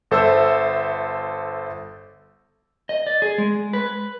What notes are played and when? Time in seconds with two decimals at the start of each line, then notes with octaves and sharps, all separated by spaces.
0.11 G1 A4 C5 E5 E6
2.89 D#5
3.07 D5
3.22 G#4
3.38 G#3
3.73 B4